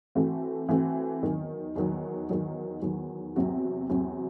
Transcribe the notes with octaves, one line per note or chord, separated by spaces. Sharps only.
E3 A3 C4 F#4
E3 A3 C4 F#4
E2 D#3 F#3
E2 D#3 F#3
E2 D#3 F#3
E2 D#3 F#3
E2 C3 F#3 C4 F#4
E2 C3 F#3 C4 F#4